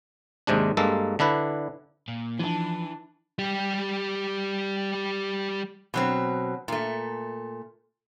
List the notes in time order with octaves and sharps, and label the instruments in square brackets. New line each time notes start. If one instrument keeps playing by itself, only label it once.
[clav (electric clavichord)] D#2 G#2 C3 G#3 D4
G2 G#3 A#3 A4
D3 D4 E4 B4
[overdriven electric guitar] A#2
[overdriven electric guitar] E3 [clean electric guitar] F3 [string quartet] D4 [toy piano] D#4 A5
[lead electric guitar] G3 G4
[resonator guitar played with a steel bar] B2 F#3 C4
A#2 A3